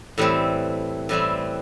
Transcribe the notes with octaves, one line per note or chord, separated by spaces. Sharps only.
A2 E3 G3 C4
A2 E3 G3 C4